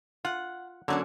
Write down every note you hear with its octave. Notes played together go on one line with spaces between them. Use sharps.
F4 F#5
D3 F#3 A#3 C#4 D4